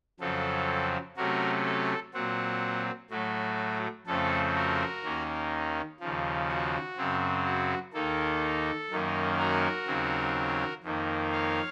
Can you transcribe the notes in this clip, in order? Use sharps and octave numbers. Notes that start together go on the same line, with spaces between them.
F2 C#3 F#3 C4 A4
C3 F#3 A3 C#4 F#4 A#4
A4
A#2 F#3 C4 F#4
A2 F#3 A3 F#4
F2 C#3 A3 C4 A4
F#4 A#4
D#2 D#3 A#3 C#4
D#2 C#3 F3
F#4
F#2 C#3 F#3 C4
F#4
D#2 D#3 A#3 A4
F#2 D#3 A#3 C#4
F#4 A#4
D#2 C#3 F#3 C4
F2 D#3 A#3
C#5 F5